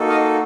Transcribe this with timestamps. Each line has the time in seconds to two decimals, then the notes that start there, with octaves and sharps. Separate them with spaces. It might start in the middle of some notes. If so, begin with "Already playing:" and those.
Already playing: A#3 D#4 F#4 A4
0.09 D#5 F5